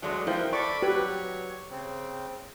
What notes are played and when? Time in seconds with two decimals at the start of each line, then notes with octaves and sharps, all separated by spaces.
0.02 D2 F#3 G#3 A3 D4
0.27 F3 F#3 E4 A#4 C5 G5
0.53 A4 D5 B5 C#6 D6
0.82 F#3 G4 B4 C#5
1.71 C#3 C4